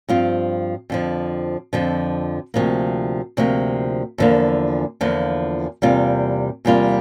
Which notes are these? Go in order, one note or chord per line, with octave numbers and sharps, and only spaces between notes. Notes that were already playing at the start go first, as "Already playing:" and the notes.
G2 F3 C4 F4
F2 D3 F3
F2 D3 F3
D2 C3 F3 A#3
D2 C3 F3 A#3
E2 D3 F3 A#3
E2 D3 F3 A#3
E2 C3 G3 A#3 F4
E2 C3 G3 A#3 F4